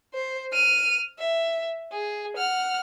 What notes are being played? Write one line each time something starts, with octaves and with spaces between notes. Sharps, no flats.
C5
F6 D#7
E5
G#4
F#5 F6